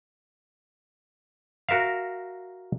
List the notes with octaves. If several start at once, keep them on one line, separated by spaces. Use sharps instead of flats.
F#4 A#4 E5 F5